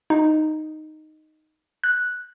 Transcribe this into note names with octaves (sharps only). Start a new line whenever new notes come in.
D#4
F#6